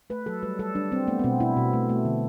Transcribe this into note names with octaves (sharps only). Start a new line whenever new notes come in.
A3 B4
F#3 A4
G3 B4
G3 A4
G3 D4
G3 C4
A3 B3
B3
B2 C4
B2 E4
B2
A3
A3
D3